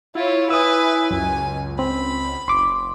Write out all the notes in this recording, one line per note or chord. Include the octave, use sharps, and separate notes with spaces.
E4 F4 C#5
B4 G#5 D#6 E6
C#2 F#2 G#5
C4 B5
F#1 C6 D6